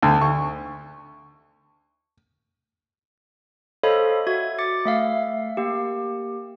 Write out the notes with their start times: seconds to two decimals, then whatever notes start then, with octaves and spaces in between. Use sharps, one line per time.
0.02 D2
0.21 C#6
3.83 A4 C5 C#5 D#5 F5 B5
4.27 F#4 E5 G#6
4.59 D6 A6 C#7
4.85 A3 E5 F5
5.57 A#3 G4